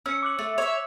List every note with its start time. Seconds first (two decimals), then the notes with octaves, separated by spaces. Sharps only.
0.06 C#4 E6 C#7
0.23 D6 F#6 F#7
0.39 A3
0.58 C#5 E5